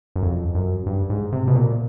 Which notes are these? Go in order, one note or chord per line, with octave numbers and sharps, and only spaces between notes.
F#2
F2
F#2
G2
G#2
C3
B2
A#2